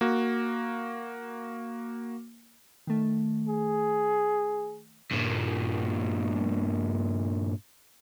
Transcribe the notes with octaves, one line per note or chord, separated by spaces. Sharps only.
A#3 F#4
D#3 A3
G#4
G2 A#2